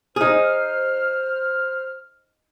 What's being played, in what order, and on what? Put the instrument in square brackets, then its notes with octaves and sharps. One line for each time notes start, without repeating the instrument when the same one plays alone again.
[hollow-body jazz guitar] D#4 G#4 [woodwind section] C5 F6